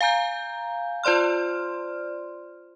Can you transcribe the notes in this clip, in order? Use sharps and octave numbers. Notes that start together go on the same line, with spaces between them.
F5 G#5 A#5 G6
F4 C5 D5 C6 F6